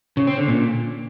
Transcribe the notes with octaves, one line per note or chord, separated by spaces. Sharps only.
C#3
C4
D3
A#2